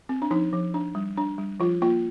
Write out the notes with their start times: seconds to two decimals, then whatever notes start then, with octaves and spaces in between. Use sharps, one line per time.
0.09 C4
0.22 D4
0.31 F3 D#4
0.53 F3
0.74 D4
0.95 G3
1.17 D4
1.38 G3
1.60 F3 F4
1.82 A#3 F4